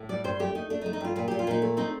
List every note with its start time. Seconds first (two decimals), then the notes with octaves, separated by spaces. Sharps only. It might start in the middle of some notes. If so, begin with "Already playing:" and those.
Already playing: A2
0.09 G3 D5
0.24 G2 C5
0.40 A3 G4
0.55 A3 D#4
0.70 A3 D4
0.81 D#4
0.86 A3
0.93 D#4
1.01 G2 F4
1.16 A#2 F4
1.28 G4
1.31 A#2
1.39 F4
1.47 A#2 D#4
1.62 A3
1.77 C4 D#4